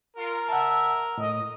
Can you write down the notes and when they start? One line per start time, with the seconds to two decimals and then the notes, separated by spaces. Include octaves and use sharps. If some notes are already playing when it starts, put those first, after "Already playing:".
0.16 F4 A#4
0.48 E5 F#5 A5
1.18 A2 D#5